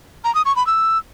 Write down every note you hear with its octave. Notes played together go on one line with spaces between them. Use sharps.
A#5
D#6
C#6
B5
E6